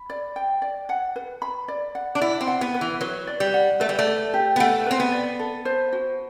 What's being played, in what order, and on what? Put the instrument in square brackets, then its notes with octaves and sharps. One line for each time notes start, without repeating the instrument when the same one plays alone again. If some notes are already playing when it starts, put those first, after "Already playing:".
Already playing: [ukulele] B5
D5
G5
D5
F#5
B4
B5
D5
F#5
[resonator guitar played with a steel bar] D4
[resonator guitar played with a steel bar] E4 [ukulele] D5
[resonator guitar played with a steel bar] C4
[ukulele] F#5
[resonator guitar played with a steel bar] B3
[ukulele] B4
[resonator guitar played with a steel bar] E3
[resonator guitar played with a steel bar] F#3 [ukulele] B4
[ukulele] D5
[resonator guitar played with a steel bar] G3
[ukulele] F#5
[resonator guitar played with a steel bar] A3 [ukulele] B4
[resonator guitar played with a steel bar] G3
A3
[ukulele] D5
G4
[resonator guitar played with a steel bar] B3
[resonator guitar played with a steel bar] A3 [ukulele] F#5
[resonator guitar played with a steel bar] C4 [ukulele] B4
[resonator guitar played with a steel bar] B3
[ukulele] D5
A4
C5
F#4